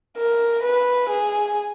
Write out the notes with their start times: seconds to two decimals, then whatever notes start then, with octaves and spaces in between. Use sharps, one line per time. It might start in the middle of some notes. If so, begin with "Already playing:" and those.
0.17 A#4
0.63 B4
1.10 G#4